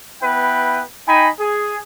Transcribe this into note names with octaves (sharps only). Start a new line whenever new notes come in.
B3 E4 B4 G5
D#4 G5 G#5 B5
G#4